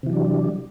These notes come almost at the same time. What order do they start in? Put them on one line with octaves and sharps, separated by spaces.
C3 E3 F#3 D4 G3